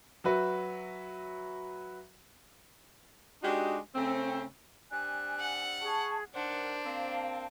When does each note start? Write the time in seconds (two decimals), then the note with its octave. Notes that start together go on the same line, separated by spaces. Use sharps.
0.24 F#3 F#4 B4 E5
3.42 G#3 D4 D#4 F#4 G4
3.95 C#3 A3 C4
4.92 G3 C4 D4 G#5 F#6
5.39 F#5
5.82 G#4 A5 C#6
6.34 D#3 D4 A#4 C5 F#5
6.85 A#3 C4 F5 A5